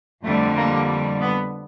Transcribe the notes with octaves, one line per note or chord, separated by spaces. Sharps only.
F2 D3 G3 A3
A#3
B3